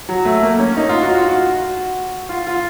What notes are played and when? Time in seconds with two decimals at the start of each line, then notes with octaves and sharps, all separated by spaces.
0.09 F#3
0.25 A3
0.43 A#3
0.59 C#4
0.77 D#4
0.89 F4
1.02 F#4
1.15 F4
1.28 F#4
2.29 F4
2.47 F4